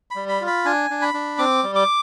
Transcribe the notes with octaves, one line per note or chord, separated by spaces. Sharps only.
B5
G3
B5
F4
B5
D4 G#5
D4
B5
D4
C4 D6
G3
D6